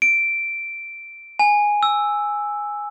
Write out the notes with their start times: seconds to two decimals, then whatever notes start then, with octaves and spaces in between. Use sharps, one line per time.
0.02 D7
1.39 G#5
1.83 E6